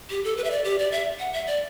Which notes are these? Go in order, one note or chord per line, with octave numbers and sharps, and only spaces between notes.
G4
A4
B4
E5
D5
G4
D5
E5
F#5
E5
D5